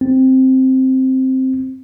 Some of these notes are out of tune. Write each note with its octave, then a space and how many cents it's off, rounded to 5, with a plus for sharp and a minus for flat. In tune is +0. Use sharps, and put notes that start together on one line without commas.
C4 +0